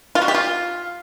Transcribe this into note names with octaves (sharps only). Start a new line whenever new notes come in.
F4
F#4
G4
F4